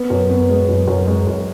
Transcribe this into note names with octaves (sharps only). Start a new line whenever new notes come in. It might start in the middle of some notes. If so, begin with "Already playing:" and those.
Already playing: B3
F#2
B3
G#3
F#2
F#2
G#3
F#2